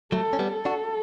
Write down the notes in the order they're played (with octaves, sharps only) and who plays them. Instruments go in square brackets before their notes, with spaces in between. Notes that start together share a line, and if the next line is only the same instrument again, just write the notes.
[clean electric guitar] F#3 A3 [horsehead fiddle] A4
[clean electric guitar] C#4
G3 B3
[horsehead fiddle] A4
[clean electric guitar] D4 F#4